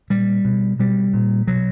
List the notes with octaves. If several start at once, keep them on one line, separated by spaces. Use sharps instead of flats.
A#2 G3
B2
B2 G3
A#2
B2 F#3